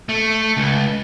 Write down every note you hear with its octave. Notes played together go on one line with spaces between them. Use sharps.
A3
C#2